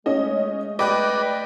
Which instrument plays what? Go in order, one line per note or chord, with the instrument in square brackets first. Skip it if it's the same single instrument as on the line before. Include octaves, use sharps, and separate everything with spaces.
[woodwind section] G#3 A3 [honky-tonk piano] C#4 D#5
[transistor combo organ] B4 D5 [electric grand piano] D#5 G5 F#6 [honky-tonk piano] D6